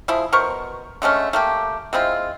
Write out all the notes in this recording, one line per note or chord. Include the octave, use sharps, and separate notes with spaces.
F3 E4 G#4
B2 A#4 C5 C#6
D3 G#3 A3 C#4
A3 A#3 G4
G#3 C4 E4 F4